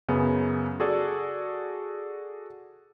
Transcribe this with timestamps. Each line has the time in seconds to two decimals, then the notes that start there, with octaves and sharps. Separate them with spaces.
0.08 F#2 C#3 B3
0.80 F#4 G#4 A4 D5